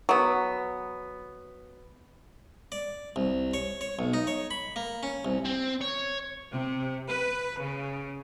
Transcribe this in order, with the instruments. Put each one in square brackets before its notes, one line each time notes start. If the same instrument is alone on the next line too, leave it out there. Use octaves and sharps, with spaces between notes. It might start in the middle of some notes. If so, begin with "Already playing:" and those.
[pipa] F#3 B3
[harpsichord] D5
C2
C#5
C#5
B1
D#4
C#5
B5
A#3
C#4
C2
[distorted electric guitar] C4
C#5
[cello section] C3
B4
C#3